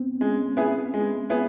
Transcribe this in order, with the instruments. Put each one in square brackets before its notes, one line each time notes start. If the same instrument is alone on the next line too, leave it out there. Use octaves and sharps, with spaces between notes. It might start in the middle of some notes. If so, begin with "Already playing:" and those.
Already playing: [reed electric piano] B3 C4
[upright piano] G#3 [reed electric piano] C#4
[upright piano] B3 E4 G#4
G#3
B3 E4 G#4